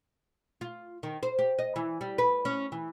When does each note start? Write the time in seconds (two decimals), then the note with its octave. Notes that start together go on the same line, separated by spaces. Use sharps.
0.61 F4
1.03 D#3
1.23 C5
1.39 G4
1.59 D#5
1.76 E3
2.01 G3
2.18 B4
2.45 C#4
2.72 E3